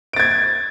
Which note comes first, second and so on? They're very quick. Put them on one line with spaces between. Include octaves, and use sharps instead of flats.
D7 A6 G#6